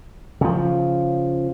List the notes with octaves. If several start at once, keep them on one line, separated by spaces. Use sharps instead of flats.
C#3 F3